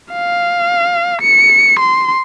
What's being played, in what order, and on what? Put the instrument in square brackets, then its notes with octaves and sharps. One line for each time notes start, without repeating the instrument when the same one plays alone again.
[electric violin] F5
C#7
C6